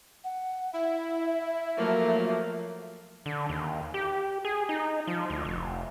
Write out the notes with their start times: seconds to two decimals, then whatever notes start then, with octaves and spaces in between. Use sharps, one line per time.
0.24 F#5
0.73 E4 E5
1.77 F3 F#3 A3 A#3
3.26 D3
3.49 D#2
3.94 G4
4.45 G#4
4.69 D#4
5.07 F3
5.30 D2
5.45 F1